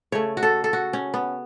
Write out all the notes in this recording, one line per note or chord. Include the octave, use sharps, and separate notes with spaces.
C#3 A3 C#5
F#4
A4
A4
F#4
C#4
B3